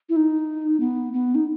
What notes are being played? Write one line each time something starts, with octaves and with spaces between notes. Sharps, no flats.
E4
D#4
B3
B3
D#4